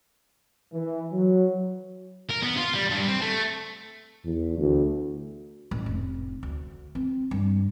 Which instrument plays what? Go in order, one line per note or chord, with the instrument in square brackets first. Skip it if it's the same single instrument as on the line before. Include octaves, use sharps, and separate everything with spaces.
[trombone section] E3
F#3
[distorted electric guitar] A#4
B3
F4
G3
G2
C4
A3
[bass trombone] E2
D2
[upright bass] A1
F1
D2
C4
G2